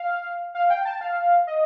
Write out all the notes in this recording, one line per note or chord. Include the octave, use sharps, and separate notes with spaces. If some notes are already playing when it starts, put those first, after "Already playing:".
Already playing: F5
F5
G5
A5
F5
D#5